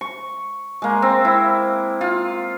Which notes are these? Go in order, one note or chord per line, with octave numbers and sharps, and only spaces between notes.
C#6
G#3 A#3
C4
E4
F4